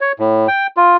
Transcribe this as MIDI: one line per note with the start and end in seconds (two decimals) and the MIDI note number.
0.01 0.12 73
0.20 0.47 45
0.48 0.67 79
0.77 0.97 65